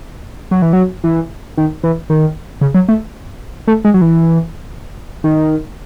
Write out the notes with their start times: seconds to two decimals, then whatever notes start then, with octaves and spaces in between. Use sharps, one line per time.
0.51 F#3
0.62 E3
0.73 F#3
1.04 E3
1.57 D#3
1.84 E3
2.10 D#3
2.61 C#3
2.74 F#3
2.89 A3
3.68 A3
3.84 G#3
3.94 F#3
4.01 E3
5.24 D#3